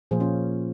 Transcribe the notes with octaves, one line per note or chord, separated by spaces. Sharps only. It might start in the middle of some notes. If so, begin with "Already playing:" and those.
A#2 F3 A#3 G#4 C5
C#4 F4